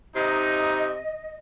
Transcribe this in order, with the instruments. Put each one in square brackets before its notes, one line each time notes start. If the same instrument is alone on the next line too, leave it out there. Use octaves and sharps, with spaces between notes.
[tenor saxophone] C3 [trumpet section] D#4 [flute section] D#5